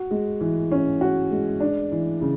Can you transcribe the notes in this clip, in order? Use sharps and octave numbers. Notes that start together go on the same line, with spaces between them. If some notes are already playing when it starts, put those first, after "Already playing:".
Already playing: F#4
G#3
E3
C#4
F#4
G#3
D4
E3
C#3